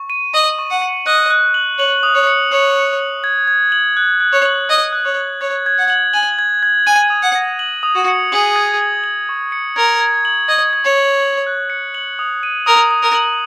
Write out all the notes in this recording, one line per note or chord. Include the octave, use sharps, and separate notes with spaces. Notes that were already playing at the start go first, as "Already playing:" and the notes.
Already playing: C#6
D#7
D#5 F#7
C#6
F#5
C#7
D#5 F#6
F#6
F#7
C#5 F#7
D#6
C#5
C#7
C#5 F#6
F#6
F#7
G#6
G#6
F#7
F#6
F#6
C#5
F#7
D#5 F#6
F#6
C#5
F#7
C#5 G#6
G#6
F#5
F#7
G#5 F#7
G#6
G#6
G#5 D#7
D#6
F#5
A#6
F#7
D#6
F#4
C#7
G#4 F#7
G#6
G#6
F#7
C#6
C#7
A#4 G#6
G#6
F#7
D#5 G#6
G#6
C#5
F#7
F#7
F#6
C#7
F#7
D#6
D#7
A#4 D#6
D#6
A#4
F#7